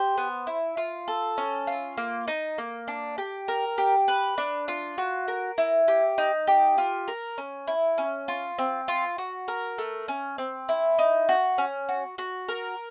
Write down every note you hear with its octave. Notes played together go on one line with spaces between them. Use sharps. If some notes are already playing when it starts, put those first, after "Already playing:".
Already playing: G4 C5
B3
E4
F4
A4
C#4
F4
A#3
D#4
A#3
D4
G4
A#4
G4
B4
D4
F4
F#4
A#4
E4
G4
D#4
G4
F4
A#4
C#4
E4
C#4
F4
C4
F4
F#4
A#4
A3
C#4
C4
E4
D#4
F#4
C#4
F#4
F#4
A#4